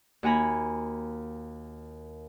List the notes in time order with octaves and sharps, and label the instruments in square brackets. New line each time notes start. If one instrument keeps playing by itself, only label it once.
[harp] D#2 F#4 G#5 A#5 B5